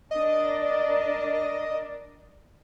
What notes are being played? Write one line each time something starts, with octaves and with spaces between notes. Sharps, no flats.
D4 A#4 D5 D#5